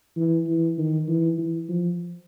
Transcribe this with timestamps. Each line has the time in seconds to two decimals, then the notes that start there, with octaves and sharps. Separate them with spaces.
0.16 E3
0.47 E3
0.78 D#3
1.08 E3
1.38 E3
1.69 F3